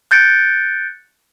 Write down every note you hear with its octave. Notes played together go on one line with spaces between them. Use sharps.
F#6 G6 A6 C#7 D7